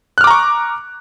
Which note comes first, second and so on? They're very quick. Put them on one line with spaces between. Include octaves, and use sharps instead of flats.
F#6 F6 D6 A#5 C#6